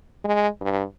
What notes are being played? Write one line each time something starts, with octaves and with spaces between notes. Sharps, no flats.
G#3
G2